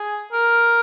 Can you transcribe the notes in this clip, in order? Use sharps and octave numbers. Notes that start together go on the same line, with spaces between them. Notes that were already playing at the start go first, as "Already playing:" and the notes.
Already playing: G#4
A#4